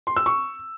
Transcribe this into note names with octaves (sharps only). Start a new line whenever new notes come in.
C6
E6
C#6